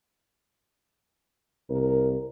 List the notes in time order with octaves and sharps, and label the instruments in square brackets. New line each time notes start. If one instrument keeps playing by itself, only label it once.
[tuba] C2 [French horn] A#4